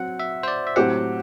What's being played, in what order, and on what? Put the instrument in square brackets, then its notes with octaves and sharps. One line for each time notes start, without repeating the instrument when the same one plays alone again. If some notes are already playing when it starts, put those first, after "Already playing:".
Already playing: [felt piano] F#3 C4 [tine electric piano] F#5
[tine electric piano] E5
C5
D5
E5
[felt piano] A2 F#3 C4 G4 C5 [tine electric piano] F#5